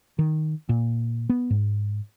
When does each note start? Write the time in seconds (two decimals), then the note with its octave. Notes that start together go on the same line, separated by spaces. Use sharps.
0.19 D#3
0.69 A#2
1.29 B3
1.50 G#2